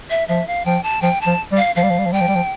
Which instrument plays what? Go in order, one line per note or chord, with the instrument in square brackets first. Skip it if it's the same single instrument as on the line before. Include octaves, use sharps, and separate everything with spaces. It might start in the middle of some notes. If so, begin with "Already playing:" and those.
[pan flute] E5
[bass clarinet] F3 [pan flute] E5
[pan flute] F5
[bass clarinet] F3 [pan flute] G5
[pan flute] A5
[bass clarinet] F3 [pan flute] G5
[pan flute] A5
[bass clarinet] F3
G3
[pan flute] F5
[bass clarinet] F3 [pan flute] F5
[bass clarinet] G3
F3
G3
F3
[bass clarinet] G3 [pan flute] G5
[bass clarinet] F3
G3
F3